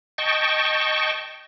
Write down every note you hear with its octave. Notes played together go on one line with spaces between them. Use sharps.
D#5 G5 A5 C#6